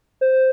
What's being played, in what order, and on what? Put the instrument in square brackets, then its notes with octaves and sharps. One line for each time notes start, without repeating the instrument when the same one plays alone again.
[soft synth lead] C5